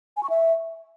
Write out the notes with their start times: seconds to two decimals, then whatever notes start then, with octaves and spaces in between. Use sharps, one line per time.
0.17 G#5
0.23 C#6
0.30 E5